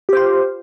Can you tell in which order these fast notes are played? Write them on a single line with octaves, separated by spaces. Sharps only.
G4 C5 F4